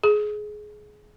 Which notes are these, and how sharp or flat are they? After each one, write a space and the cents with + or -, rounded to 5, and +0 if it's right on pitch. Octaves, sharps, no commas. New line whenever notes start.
G#4 +20